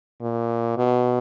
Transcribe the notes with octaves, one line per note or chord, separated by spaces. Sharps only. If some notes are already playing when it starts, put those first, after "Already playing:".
A#2
B2